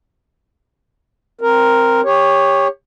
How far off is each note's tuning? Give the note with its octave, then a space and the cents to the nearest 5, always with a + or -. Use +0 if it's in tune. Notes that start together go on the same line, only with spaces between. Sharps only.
C4 +0 A#4 +0
G4 +25 C#5 +0